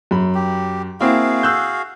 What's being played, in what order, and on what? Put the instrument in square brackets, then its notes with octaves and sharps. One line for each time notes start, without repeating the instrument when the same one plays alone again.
[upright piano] F#2 B5
[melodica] G4
[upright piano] A#3 C4 E4 [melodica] F#4 G#4 F5
[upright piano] E6 F#6 G6